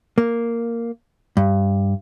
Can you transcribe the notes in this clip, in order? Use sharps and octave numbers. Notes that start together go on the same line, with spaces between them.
A#3
G2